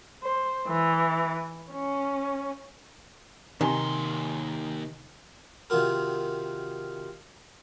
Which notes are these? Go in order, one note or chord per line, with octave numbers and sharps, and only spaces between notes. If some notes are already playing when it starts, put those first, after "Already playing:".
C5
E3
C#4
D#2 C3 D#3 G#5 C6
C3 D#3 D#4 F4 F#4 A#4